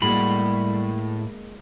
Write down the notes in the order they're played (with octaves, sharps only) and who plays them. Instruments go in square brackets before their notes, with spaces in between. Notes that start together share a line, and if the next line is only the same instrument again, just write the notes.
[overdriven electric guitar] A2 [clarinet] G3 [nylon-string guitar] G#3 A#3 F#4 [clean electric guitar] B5